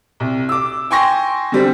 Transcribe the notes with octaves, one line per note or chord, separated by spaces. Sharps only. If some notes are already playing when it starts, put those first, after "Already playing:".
C2
D6 E6
G5 G#5 C6 C#6 A#6
D3 G3 C4